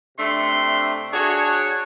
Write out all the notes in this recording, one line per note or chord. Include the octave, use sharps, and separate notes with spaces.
C3 A3 D4 C6
D4 F#4 G#4 C#5